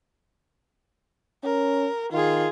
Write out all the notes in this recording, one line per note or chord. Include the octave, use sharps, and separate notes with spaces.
C#4 A#4
D#3 F4 G#4